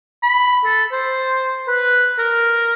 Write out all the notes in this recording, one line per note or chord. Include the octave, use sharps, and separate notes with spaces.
B5
A4
C5
B4
A#4